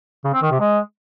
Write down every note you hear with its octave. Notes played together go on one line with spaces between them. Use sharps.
C#3
C4
D#3
C3
G#3